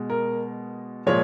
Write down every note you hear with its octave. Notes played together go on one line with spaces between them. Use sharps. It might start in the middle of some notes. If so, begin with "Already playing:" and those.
Already playing: B2 G#3
A#4
A#2 F3 G#3 C#5